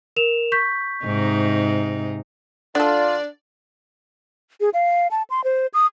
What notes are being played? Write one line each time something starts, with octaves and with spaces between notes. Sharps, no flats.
A#4 E7 F7
C#6 G6 B6
G#2 C3 D#4
D3 D4 F4 A4 D5
G#4
F5
A5
C6
C5
D#6